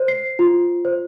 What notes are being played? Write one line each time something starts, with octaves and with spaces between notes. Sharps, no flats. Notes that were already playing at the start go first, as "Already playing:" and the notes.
Already playing: C5
C7
F4
C5